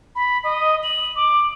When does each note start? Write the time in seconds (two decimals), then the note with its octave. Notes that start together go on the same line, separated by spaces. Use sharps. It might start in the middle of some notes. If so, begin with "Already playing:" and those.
0.16 B5
0.44 D#5
0.83 F#7
1.16 D6